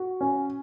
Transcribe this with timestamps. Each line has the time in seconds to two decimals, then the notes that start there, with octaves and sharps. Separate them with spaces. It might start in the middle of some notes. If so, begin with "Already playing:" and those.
Already playing: F#4
0.21 C#4